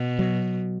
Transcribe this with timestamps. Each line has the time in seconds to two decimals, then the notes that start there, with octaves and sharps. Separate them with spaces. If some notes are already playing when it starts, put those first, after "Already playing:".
Already playing: B2
0.19 F#3